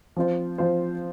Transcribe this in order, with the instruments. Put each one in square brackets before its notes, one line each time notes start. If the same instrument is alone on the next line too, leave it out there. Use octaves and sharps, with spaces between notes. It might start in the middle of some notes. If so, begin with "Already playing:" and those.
[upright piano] F3 C4 F4 C5
F3 C4 F4 C5